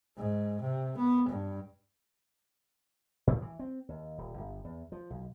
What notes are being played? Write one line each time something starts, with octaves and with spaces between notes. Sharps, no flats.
G#2
C3
B3
G2
A2
E3
C4
D#2
D#1
G1
E2
F3
B1